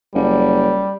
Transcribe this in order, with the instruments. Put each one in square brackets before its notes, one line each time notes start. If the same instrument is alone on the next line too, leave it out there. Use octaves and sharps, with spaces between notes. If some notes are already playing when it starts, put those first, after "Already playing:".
[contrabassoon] F#1 [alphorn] G3